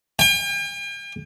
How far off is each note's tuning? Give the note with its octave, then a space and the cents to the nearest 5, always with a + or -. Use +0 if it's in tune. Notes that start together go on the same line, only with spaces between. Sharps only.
G5 +45